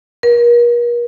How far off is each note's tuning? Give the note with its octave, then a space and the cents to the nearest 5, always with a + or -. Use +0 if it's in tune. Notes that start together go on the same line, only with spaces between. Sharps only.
A#4 +40